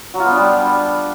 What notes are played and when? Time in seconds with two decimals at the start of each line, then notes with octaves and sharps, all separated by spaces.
0.14 F#3
0.20 F4
0.26 B3
0.31 D4
0.37 G3